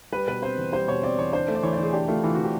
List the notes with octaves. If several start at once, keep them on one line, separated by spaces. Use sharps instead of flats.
G3 B4
B2 B4
C4 C5
E2
G3 C5
B2 C#5
C4 D5
E2 C#5
D4 C5
A3
D5
E3 C#5
D5
E3 G#4
D4 G4
A3 F4
E3 F4
F#4
E3
G4